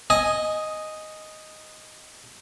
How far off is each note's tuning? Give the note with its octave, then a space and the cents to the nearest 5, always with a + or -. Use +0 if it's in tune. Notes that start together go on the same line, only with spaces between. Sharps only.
D#5 +0 G#5 +0